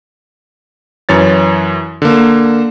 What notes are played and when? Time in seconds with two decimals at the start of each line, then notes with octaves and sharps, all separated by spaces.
1.09 F#2 E3 C#5 A6
2.02 D3 A#3